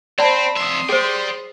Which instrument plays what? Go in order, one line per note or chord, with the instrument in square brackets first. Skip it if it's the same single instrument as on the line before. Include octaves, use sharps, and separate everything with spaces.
[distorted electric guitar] C4 [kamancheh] C5 B5 [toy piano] D5 A5
[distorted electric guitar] F2 E5 [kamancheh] C6 D#6
[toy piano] G#4 C5 [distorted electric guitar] D5 G5